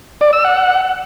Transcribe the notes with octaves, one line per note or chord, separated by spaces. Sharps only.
D5
E6
F#5